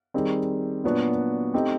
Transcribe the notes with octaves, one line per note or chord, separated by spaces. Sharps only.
D#3 G3 C4 D#4 G#4
A#2 F#3 B3 D4 F#4
A3 C4 D#4 G4